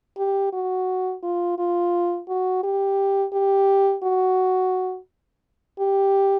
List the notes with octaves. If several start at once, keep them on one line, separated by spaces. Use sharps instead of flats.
G4
F#4
F4
F4
F#4
G4
G4
F#4
G4